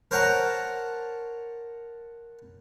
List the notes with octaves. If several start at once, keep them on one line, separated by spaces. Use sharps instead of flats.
A#4 C5 C#5 F#5 A5 A#5